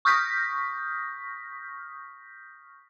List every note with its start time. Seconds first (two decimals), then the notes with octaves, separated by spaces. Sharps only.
0.05 C#6 D#6 F6 G6 A#6 B6